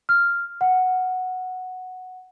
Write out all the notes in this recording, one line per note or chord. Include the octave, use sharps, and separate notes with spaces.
F6
F#5